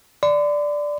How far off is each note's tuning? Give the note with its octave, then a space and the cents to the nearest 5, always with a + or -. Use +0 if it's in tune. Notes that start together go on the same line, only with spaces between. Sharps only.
D5 +0 C6 -45